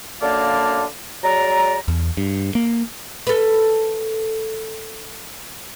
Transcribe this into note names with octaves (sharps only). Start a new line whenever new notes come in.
F#2 D3 A#3 D5 F5 A5
F#3 G#3 D5 A#5
E2
G2
A#3
A4 B4